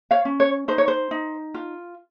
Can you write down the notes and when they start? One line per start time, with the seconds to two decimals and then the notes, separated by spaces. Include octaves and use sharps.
0.11 C#5 F5
0.25 C#4
0.40 C#5
0.68 D#4 C5
0.78 C#5
0.88 C5
1.11 D#4
1.54 F4